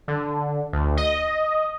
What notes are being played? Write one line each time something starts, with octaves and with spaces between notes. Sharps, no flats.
D3
D2
D#5